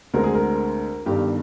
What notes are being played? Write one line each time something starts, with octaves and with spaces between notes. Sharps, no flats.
D2 D3 G#3 C4 A#4
G#4
A#4
G1 G2 D#3 G4